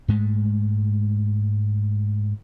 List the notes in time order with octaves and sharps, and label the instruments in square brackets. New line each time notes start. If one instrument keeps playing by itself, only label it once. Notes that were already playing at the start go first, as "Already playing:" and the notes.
[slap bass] G#2 G#3 A3